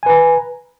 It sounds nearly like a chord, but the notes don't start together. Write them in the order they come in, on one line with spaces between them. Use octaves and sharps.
G#5 B4 A#5